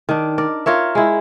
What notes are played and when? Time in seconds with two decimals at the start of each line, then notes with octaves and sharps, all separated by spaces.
0.09 D#3 D4
0.38 A#4 D5
0.66 F4 A#4 C#5 E5
0.95 G#3 E4